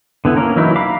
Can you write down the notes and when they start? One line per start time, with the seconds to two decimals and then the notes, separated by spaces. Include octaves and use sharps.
0.25 D3 B3 E4
0.36 A#3 C#4 A#4
0.56 E3 F#3 D#4 E4
0.76 F5 A#5 B5 D6